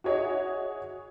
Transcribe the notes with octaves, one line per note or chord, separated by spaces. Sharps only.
F#4 G#4 C#5 D#5 E5